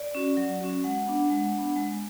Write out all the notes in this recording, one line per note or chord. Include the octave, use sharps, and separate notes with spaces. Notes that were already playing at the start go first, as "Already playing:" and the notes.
Already playing: D5
C#4 F#4
F#3
C#4 F#4
G#3 F#5
B3 D4
G#3
D4
B3
G#3